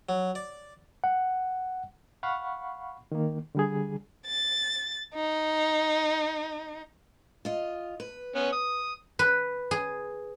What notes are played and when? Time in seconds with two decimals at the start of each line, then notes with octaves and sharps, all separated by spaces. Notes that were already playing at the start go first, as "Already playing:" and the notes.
0.09 F#3
0.35 D5
1.04 F#5
2.23 F5 F#5 B5 C#6
3.12 D#3 A#3
3.55 D3 G3 G#4
4.27 A6
5.14 D#4
7.45 F4 D#5
8.00 B4
8.35 B3 C#4
8.53 D#6
9.19 B4
9.71 G#4